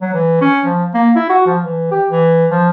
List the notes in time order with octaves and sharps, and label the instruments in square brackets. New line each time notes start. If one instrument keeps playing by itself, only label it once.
[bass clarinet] F#3
E3
C#4
F3
A#3
E4
F#4
F3
E3
G4
E3
F3